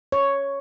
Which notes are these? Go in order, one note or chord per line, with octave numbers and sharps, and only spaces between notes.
C#5